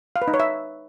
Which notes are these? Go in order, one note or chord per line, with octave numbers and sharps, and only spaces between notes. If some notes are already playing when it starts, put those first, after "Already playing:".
F5
B4
D#4
C#5
E5